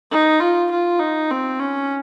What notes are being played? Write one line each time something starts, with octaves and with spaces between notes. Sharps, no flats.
D#4
F4
F4
D#4
C4
C#4